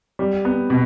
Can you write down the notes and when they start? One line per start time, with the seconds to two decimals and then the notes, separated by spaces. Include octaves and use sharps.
0.19 G3
0.45 B3
0.70 B2